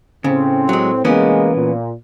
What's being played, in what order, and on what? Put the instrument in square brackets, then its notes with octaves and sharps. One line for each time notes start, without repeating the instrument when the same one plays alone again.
[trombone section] A2 C4 [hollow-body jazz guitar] C#3
[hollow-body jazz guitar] F#3 G#3
[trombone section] C2 G#3 A#3 [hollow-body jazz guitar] E3 B3 C#4
[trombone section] A#2